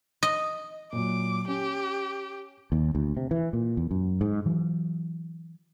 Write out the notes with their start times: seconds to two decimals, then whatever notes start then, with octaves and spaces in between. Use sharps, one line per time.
0.23 D#5
0.93 A#2 F#3 D6
1.48 C#4 G4
2.72 D#2
2.95 D2
3.17 C3
3.31 E3
3.53 A#2
3.77 E2
3.91 F#2
4.21 G#2
4.46 E3 F#3